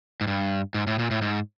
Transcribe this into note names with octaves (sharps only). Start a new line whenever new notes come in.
G#2
G2
G#2
A2
A#2
A2
G#2